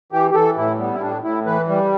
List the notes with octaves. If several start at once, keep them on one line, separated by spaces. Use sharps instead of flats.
E3 G4
G4
E3 A4
A2 E4
G3 B3
E4
A2 D4
A2 E4
E3 B4
G3